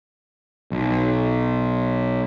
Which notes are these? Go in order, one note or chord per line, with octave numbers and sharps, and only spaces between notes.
B1